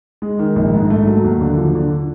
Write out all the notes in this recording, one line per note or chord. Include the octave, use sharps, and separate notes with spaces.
G#3
D#3
A#1
G#2
A3
F#3
D#2
D3
F3
D3